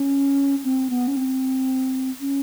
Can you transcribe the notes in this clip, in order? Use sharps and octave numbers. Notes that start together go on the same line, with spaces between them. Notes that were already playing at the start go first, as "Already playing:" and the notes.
Already playing: C#4
C4
B3
C#4
C4
C#4